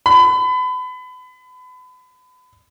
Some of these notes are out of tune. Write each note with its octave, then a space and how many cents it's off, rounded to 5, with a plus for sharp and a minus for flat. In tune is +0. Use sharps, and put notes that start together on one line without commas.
B5 +35